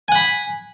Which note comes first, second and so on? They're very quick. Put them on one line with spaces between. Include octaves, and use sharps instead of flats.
G#5 F#5 B5